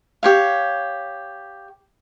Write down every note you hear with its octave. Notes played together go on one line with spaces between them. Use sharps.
G4 C#5 F5